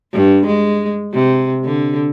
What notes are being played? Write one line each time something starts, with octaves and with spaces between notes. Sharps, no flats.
G2
G#3
C3
D3